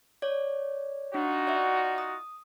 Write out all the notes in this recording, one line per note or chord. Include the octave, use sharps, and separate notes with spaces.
C#5 D5
D4 D#4 F4 F#4
D5 E5
D#6